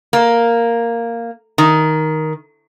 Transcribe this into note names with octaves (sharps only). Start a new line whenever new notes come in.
A#3
D#3